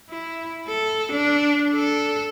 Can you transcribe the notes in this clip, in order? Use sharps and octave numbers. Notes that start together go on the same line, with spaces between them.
E4
A4
D4
A4